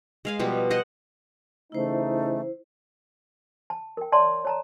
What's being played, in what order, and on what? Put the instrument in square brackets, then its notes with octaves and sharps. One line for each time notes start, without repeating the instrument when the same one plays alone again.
[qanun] G#3 F5 G#5
B2 F3 G3 B3
C5 D#5 F#5 C6
[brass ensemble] C#3 E3 D#4 [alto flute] A3 [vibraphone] E4 C5
[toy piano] A5
A#4 G5
C#5 D5 E5 A5 C6
C#5 A5 A#5